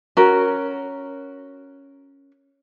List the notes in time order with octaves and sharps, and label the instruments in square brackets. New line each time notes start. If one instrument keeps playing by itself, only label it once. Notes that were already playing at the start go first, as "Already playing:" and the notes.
[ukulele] C#4 F#4 A#4